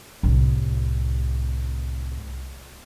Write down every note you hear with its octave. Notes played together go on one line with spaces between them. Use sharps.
C2 A2